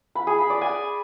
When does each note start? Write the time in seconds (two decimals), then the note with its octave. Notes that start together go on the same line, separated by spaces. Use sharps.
0.15 B5
0.27 G#4
0.38 B5
0.50 D5
0.61 G#5